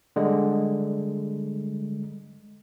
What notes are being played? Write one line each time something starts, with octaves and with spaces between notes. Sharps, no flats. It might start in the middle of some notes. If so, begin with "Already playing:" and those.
D3 G3 G#3